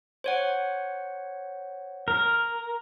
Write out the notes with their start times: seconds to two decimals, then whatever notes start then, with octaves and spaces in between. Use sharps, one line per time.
0.24 C5 C#5 F#5
2.08 A#4